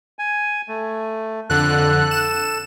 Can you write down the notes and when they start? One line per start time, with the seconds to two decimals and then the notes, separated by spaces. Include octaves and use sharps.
0.19 G#5
0.69 A3
1.50 F2 D3 A4 F#6
2.11 E7